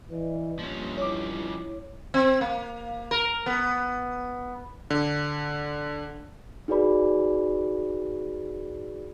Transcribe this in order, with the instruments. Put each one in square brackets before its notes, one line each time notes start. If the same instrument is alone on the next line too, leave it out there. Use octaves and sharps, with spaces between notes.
[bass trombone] E3 [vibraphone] B4 D5 D#5
[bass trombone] G2 [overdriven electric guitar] F3 C#4 [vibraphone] A#3 C6
[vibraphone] E4 [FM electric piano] C#5 D6
[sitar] C4
A#3
A#4
B3
[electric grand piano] D3
[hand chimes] D#4 F#4 G#4 B4 D5 B5